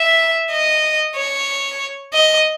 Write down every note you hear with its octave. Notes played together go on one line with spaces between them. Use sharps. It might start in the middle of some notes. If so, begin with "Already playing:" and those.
Already playing: E5
D#5
C#5
D#5